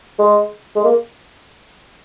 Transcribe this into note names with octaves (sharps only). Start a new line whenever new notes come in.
G#3
G#3
A#3